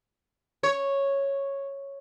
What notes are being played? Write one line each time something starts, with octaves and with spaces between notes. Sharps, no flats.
C#5